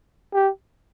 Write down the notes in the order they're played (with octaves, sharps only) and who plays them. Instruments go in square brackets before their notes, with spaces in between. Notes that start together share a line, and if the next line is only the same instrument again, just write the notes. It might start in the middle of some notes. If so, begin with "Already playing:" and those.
[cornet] G4